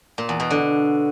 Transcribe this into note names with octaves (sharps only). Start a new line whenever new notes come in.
A#2
E2
B2
D3